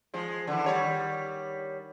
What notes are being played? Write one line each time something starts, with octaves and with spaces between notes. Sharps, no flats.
F3 G#3
D3 E3
D#3 G3 C#5